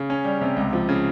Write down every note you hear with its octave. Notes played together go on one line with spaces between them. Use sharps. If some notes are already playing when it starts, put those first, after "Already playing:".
Already playing: C#3
C#4
G3
C3
C#2
F3
C#3